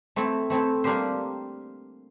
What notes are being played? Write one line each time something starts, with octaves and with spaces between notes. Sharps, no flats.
A3 C4 E4 A4
A3 C4 E4 A4
G3 A#3 D4 G4 C5